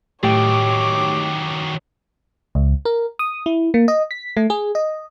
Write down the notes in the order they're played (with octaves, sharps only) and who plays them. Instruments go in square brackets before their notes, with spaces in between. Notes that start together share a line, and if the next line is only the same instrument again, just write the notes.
[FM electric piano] A2 [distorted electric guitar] D#3 F#3 [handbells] G4 G5 [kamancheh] C#5 D6
[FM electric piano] C#2
A#4
D#6
E4
A#3
D#5
B6
A3
G#4
D#5